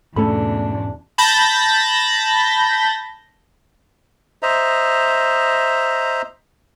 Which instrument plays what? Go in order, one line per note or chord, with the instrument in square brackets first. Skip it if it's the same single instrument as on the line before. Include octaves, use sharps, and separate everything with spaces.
[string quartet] E2 B2 D4 [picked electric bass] G#2 C#4 [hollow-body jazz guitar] A3 A4 B5
[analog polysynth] A5 B5 G6 A6 A#6
[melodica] C5 D#5 E5 A#5